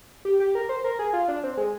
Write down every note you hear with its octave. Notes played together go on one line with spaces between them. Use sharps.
G4
G4
A#4
C5
A#4
G#4
F4
D4
C4
G#3